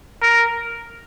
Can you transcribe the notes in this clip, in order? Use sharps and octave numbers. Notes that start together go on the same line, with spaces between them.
A#4